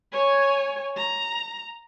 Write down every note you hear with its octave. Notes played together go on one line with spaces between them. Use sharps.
C#5 G#5
A#5